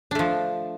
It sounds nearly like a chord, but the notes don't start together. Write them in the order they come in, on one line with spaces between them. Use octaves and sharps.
D4 A3 F3